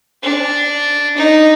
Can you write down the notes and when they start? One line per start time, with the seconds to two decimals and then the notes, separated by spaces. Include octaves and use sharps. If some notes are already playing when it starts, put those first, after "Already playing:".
0.23 D4
1.17 D#4